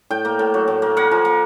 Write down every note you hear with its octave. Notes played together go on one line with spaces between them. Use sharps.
A2 G5
A#3
A2
F#3
A2
A#3
A#3 F#5
F3
A#3